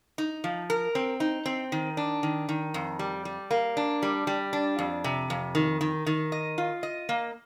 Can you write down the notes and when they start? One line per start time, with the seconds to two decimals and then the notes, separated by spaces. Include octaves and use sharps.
0.18 D#4
0.44 F3
0.70 A#4
0.95 C4
1.20 D#4
1.46 C4
1.72 D#3
1.97 D4
2.23 D#3
2.49 D#3
2.74 F2
2.99 G3
3.25 G3
3.51 A#3
3.77 D4
4.02 G3
4.27 G3
4.53 D4
4.79 F2
5.04 C3
5.30 F2
5.55 D#3
5.81 D#3
6.06 D#3
6.32 D#5
6.58 F4
6.83 D#5
7.09 A#3